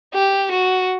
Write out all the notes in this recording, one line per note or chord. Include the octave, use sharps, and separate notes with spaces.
G4
F#4